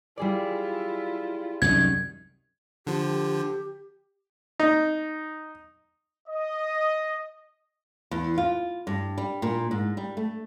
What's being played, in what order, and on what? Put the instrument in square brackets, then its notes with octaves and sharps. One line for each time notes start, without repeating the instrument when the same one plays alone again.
[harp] G3 G#4 D5 [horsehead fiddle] E4 F4
[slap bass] C2 F#2 D#3 [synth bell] G#6
[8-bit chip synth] D3 F3 [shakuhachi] G4
[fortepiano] D#4
[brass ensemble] D#5
[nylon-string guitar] E2
F4
G2
G3
A#2
G#2
G3
A3